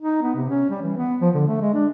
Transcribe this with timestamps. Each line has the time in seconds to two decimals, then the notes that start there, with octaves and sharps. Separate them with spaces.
0.02 D#4
0.22 B3
0.35 C3
0.50 C#4
0.70 G3
0.82 E3
0.97 B3
1.21 F3
1.34 D3
1.47 A3
1.61 G#3
1.74 D4